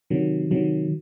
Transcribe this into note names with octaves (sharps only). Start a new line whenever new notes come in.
C3 D#3 F#3
C3 D#3 F#3